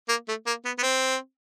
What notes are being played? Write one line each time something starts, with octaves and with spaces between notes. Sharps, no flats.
A#3
A3
A#3
B3
B3
C4